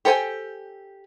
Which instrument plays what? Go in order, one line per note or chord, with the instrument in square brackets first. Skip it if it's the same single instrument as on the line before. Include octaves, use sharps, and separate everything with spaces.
[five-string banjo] G4 A4 C5 G5 G#5